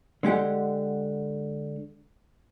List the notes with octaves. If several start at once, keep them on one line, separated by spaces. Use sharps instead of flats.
D3 G#3 G4 F#5